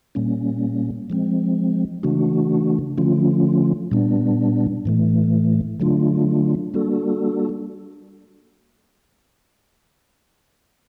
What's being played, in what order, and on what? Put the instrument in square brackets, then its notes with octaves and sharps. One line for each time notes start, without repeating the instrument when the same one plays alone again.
[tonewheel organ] A#2 G3 A#3 C#4
F3 G#3 C4
C#3 E3 A3 D4 F#4
D3 F3 A3 C#4 F4
A#2 G3 B3 D4
A2 E3 A3
D3 F#3 A3 D4 F4
G3 A#3 D4 F#4 A4